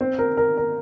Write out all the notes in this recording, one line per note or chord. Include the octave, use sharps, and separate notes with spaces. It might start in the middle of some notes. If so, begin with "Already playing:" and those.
C4
A#4
A#4
A#4